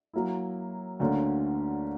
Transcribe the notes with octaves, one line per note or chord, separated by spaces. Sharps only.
F#3 A#3 E4
D2 D3 A#3 C#4